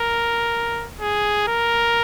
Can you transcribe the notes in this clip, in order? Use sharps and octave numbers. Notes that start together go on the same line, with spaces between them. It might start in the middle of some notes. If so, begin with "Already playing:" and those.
Already playing: A#4
G#4
A#4